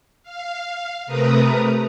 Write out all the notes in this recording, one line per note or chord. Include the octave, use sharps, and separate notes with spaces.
F5
C3 A3 A#4 B4 A#5 D#6